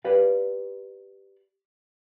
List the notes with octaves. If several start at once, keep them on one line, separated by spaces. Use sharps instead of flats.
G4 B4 D5 F5